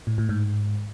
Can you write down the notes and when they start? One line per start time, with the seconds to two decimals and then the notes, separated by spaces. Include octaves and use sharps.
0.07 A2
0.18 A2
0.29 G#2